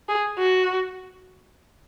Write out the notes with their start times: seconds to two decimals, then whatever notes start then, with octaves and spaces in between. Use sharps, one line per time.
0.09 G#4
0.39 F#4